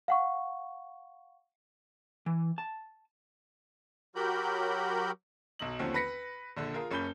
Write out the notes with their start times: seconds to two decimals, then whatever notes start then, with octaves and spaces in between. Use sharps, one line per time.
0.08 F5 F#5 C#6
2.26 E3
2.58 A5
4.16 F#3 F#4 G4 A#4 B5 G6
5.59 B1 F#3 D#5 F#7
5.79 D#2 D3 F3 A3 C4 C#4
5.94 B4 B5 A#6 B6 C#7
6.57 A#1 D3
6.74 F4 G#4 A#4
6.91 F#1 C#4 A#4 B5 G6 G7